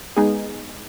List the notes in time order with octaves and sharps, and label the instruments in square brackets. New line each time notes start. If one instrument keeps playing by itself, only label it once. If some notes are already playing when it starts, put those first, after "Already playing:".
[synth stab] G#3 B3 D#4 G#4